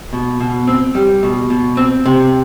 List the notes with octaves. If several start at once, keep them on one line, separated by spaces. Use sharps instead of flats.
B2
B2
C4
G3
B2
B2
C4
C3